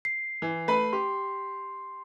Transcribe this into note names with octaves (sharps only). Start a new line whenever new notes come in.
C7
E3
A3 B4 B5
G4 C6